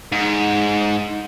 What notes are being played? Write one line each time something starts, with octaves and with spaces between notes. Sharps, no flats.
G#2